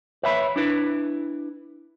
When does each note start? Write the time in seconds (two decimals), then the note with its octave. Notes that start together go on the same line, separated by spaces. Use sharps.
0.23 B4 C#5 E5 B5
0.56 D4 E4 B4